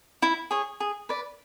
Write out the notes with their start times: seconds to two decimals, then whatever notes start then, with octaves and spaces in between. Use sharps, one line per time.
0.22 E4
0.51 G#4 C#5
0.80 G#4
1.09 B4 D5